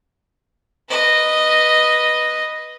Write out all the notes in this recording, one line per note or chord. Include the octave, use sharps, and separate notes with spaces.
B4 D#5